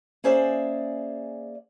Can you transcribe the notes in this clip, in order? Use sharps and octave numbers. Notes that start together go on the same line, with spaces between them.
A#3 C#4 G#4 C5 D5 E5